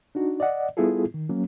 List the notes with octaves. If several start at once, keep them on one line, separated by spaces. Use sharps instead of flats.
D4 D#4 F#4
D5 D#5 F#5
G3 B3 E4 F4 G#4 A4
D#3
F#3 A#3 C#4